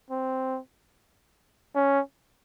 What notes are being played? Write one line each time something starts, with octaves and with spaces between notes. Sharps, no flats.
C4
C#4